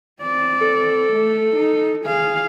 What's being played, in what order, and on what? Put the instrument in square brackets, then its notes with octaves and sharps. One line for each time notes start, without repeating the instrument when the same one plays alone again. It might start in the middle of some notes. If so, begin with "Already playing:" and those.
[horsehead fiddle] C4 D5
[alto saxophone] A4
[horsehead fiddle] A3
D#4
G#4 F5